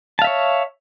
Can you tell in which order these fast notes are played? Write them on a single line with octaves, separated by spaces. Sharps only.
A5 F5 E5 C#5